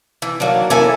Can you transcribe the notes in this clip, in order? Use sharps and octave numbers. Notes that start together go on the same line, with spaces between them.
E3
D#3 F#3 A#3 D4 F#4
E3 A#3 C#4 E4 A4 G#5